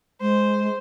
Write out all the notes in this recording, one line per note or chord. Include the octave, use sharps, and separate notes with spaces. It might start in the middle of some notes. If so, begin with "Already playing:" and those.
G#3 C5